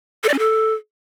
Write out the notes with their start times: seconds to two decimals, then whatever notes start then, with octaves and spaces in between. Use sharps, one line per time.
0.23 A4
0.29 D5
0.34 C#4
0.39 A4